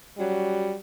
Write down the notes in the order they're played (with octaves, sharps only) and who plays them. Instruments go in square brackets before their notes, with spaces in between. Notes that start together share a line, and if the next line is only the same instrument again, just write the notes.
[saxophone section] F#3 C#4 F#4 [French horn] G3